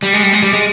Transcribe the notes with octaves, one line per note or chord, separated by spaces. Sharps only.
G3
G#3
G3
G#3
G3
G#3